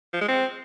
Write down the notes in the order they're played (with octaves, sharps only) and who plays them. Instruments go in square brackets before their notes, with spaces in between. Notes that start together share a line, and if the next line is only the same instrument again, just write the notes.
[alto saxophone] F3
G#3
C4